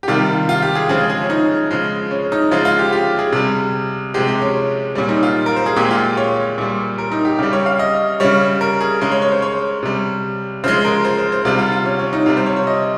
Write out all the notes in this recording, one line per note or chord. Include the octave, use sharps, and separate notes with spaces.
G4
C3 D#3 G3 F4
F4
G4
G#4
C#3 F3 G#3 G#4
G#4
C#4
D#4
C#3 F3 G#3
C#4
D#4
C#3 F3 G#3 F4
F4
G4
G4
G#4
C3 G3
C3 F3 G#3 G4
G4
C#4
A#2 G3 C#4
D#4
F4
A#4
C5
G#4
A#2 G#3 G4
F4
C#5
A#2 G3
A#4
D#4
G4
C#3 G3 G4
C#5
F5
D#5
C#3 G3 C#5
A#4
G#4
C#3 G#3 A#4
C#5
C#5
C5
C#5
C3 G3
C#3 F3 G#3 C5
A#4
C5
C5
C5
C3 G3 F4
F4
F4
C#4
C#4
D#4
C3 G3 F4
C5
C#5
C#5
D#5